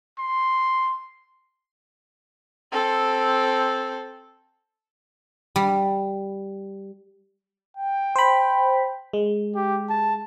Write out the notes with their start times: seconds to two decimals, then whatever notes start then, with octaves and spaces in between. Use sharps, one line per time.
0.18 C6
2.72 C4 A4
5.56 G3
7.77 G5
8.16 C5 B5
9.13 G#3
9.56 G4
9.90 A5